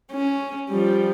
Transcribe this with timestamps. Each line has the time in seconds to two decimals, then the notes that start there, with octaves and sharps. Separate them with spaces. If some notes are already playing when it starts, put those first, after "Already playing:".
0.13 C#4
0.70 F3 G3